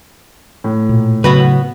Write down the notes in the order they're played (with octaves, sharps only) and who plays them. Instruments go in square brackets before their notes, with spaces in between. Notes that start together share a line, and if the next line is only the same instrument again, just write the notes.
[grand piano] A2
[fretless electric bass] A#2
[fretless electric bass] C#3 F#3 [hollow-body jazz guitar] B3 F#4 B4